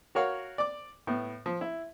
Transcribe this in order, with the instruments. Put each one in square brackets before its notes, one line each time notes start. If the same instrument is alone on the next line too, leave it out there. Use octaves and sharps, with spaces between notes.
[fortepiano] F#4 A#4 C#5 F5 F#5
D5 D6
A2 B3
F3
E4